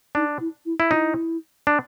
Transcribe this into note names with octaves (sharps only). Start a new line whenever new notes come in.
D4 D#4
E4
E4
E4
D#4 E4 F4
D4